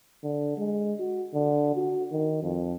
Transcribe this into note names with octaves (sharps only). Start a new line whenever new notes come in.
D3
G#3
F#4
D3
F#4
D#3
F2